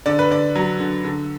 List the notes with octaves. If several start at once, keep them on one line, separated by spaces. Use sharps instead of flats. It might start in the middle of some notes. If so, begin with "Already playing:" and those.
D3 D5
B4
D3 D5
F#3
D3
D3